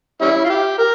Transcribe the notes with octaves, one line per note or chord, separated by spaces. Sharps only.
G3 C#4 E4
F4
G4
A#4